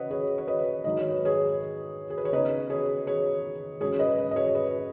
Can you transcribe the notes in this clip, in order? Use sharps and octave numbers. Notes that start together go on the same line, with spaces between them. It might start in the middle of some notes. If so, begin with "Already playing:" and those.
Already playing: C#3 C#4 B4 C#5 D#5 F#5
G#4 C#5
C#5
B4 D#5
G#2 D#3 F#3 D#4 D#5
C#5
B4
G#4 C#5
G#4
B4
C#5
C#3 B3 D#4 B4 D#5
G#4 C#5
G#4 C#5
G#2 F#3 C#4 G#4 C#5
B4 D#5
B4
D#5
G#4 C#5
B4 D#5